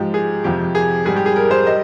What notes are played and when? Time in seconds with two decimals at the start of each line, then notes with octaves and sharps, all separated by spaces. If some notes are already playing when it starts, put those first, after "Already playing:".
Already playing: G#2 F3 G#3 G4
0.14 G#4
0.44 F2 C3 F3 G4
0.75 G#4
1.05 G#2 G3 G#4
1.16 G4
1.26 G#4
1.36 A#4
1.51 C5
1.67 G3 D#5